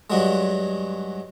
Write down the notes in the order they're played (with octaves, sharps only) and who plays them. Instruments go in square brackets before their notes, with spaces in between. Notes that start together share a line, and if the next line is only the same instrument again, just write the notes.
[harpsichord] G2 F#3 G#3